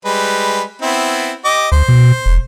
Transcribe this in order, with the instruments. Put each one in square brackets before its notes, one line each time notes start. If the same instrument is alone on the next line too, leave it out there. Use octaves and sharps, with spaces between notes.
[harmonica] G3 G#3 B4
B3 C4 E4
G4 D#5 D6
[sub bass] D2 [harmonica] C5
[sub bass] B2
E1